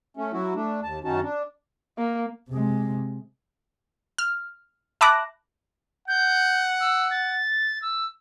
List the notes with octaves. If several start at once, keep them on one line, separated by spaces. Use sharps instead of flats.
A3 C#4
F#3 E4 F#4
A3 D4
D#2 A5
F#2 D#3 C#4 D#4 F#4 A5
D4
A#3
C3 G#3
F6
E5 A5 B5 D6 F#6 A#6
F#5 G6
E6
A6
E6